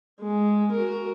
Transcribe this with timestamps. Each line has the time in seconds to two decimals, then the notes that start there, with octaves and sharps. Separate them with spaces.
0.20 G#3
0.72 F#4 A#4